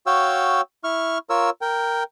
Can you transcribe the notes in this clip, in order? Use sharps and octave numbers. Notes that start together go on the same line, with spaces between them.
F#4 C#5 F5 G5 E6
E4 C#6 F6
F4 A#4 C#5 E6
A#4 G5